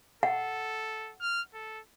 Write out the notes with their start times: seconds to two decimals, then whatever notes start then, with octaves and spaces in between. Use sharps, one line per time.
0.23 A4 F#5
1.21 F6
1.54 A4